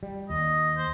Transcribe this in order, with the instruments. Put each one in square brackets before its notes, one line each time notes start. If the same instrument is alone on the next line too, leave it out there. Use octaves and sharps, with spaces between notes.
[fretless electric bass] G3
[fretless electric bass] D#2 [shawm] D#5
[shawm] C5